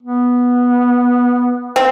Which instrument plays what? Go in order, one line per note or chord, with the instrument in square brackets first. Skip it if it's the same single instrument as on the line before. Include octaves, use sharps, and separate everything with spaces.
[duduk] B3
[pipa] C4